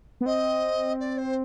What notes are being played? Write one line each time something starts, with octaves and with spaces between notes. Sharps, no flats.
B3
C4 D#5
D5
C5